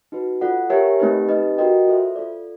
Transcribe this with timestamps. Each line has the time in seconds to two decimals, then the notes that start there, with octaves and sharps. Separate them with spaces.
0.12 D#4 F#4 B4
0.41 F4 A4 D5 F#5
0.70 G4 A#4 C#5 E5 G#5
0.99 A3 C4 D#4 G4 B4
1.28 C4 D#4 G4 B4 D#5
1.58 F#4 A#4 D#5 G5
1.87 F4 A4 C5 E5
2.16 F4 A4 D5